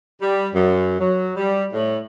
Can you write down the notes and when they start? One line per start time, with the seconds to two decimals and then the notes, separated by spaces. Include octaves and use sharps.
0.21 G3
0.53 F#2
0.98 F#3
1.36 G3
1.73 A2